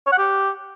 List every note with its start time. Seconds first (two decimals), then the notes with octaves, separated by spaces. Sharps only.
0.07 C#5
0.12 F#5
0.18 G4